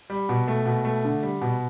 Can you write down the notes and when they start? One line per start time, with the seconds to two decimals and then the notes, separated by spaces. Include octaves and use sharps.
0.10 G3
0.29 B2
0.48 A3
0.66 B2
0.85 A3
1.05 D3
1.23 G3
1.41 B2